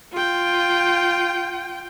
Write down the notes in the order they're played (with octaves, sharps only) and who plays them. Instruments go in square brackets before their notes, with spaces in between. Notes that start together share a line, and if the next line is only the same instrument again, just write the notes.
[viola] F4 G5